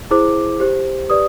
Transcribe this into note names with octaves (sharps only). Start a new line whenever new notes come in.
E4 G#4 C5 D6
G4 C5
G4 B4 D5 D#6